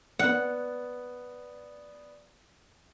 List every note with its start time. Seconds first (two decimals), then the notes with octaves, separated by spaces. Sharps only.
0.19 B3 D5 F#5